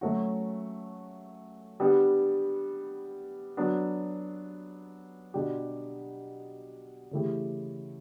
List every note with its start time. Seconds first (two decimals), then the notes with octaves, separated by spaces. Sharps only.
0.01 F#3 A3 C#4 F#4
1.80 G3 B3 D4 G4
3.57 F#3 B3 D4
5.34 B2 G3 D4 G4
7.11 C#3 E3 A3 E4 G4